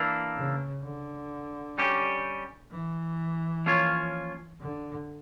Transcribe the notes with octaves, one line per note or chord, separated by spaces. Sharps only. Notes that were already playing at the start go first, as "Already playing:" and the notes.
Already playing: E3 A#3 D4
C#3
D3
G3 C#4 G4
E3
F3 A#3 C#4 F4 C#5
D3